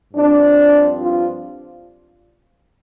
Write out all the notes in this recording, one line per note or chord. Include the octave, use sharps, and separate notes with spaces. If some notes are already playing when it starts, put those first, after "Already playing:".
G2 F3 C4 D4
F4